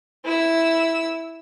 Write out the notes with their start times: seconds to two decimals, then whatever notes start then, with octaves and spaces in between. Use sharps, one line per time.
0.25 E4 E6